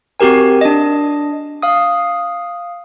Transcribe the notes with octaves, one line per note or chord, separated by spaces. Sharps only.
C4 F#4 G4 A#4 G#5
D4 D#5
F5 D#6